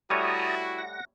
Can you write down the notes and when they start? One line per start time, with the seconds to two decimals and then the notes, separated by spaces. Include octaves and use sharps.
0.10 G3 A3 E4 F#4 C#5 A5 A#5 D#6
0.78 F#5 A#6